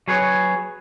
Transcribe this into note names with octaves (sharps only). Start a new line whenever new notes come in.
F#3 G#4 B4 C#5